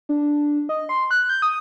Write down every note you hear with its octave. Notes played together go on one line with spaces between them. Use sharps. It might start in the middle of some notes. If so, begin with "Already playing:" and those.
D4
D#5
C6
F#6
G6
D#6